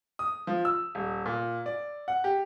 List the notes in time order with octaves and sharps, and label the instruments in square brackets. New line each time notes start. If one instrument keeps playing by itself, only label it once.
[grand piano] D#6
F3
E6
D#1
A#2
D5
F#5
G4